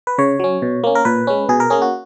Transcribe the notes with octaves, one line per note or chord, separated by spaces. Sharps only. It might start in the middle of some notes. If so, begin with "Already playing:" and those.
B4
C#3 C#5
F#3 C#4
B2
A#3 C#4
A#4
A#2 B4
G#3 C#4
B2 G#4
A#4
A#3 C#4 G#4
F#4